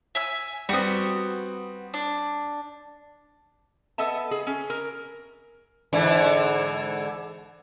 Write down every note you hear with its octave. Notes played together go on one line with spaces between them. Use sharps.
E5 G#5 E6
G3 B3 C4 F#4
D4
B3 A4 D#5 E5 A5
G#4
C#4
A#4
G#2 D3 E3